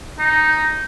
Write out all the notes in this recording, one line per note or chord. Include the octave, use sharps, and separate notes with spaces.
D#4